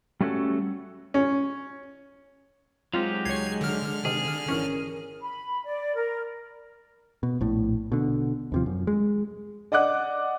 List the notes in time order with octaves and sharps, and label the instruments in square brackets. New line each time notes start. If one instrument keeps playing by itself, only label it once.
[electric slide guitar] G3 A3 C#4 F#4 A4
[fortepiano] C#4
[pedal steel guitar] F#3 D#4 G4 [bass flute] G#3 [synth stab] C4 F4
[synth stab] C#2 C#5 [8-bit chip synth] G#6 C7
[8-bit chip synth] D3 F6
[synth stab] C3 D#3 [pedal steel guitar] G#4
[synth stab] G#1 E3 C#4 [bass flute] A#4
[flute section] B5
D5
A#4
[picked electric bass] B2
A#1 A2
B2 D3
D#2 C3 F3
F#2
G#3
[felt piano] D5 D#5 F#5 D6 F#6